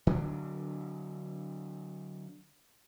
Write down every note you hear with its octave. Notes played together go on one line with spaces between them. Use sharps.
D3 F#3 B3 D4